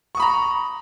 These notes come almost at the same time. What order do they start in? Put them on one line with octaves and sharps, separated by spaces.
C#6 D#6 B5 A#5